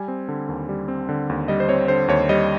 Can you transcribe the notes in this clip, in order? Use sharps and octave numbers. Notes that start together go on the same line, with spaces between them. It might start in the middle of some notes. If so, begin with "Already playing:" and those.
Already playing: G3 G#5
C4
D3
D#2
G3
C4
D3
D#2
G3 D#5
C5
C4 C#5
D3 C5
D#2 C#5
G3 D#5